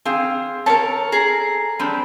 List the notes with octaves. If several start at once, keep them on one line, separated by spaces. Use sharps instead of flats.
C4 G#4 F5
A4 A#4 C#5 A5
G#4 A#5
G3 C4 D4